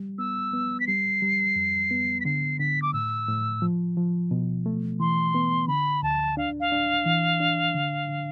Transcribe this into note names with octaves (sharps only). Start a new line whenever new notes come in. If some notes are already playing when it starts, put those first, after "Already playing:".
Already playing: G3
B3 E6
B3
B6
G3 C7
G3
F2
B3
B6
D3 C7
D3 B6
D6
A2 E6
A2
F3
F3
B2
A3
E3 C6
B3
D3 B5
D2 A5
D4 F5
F5
D4
E3
D4
D3
D3